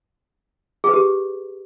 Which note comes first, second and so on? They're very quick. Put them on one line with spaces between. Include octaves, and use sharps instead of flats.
G#4 B4 G4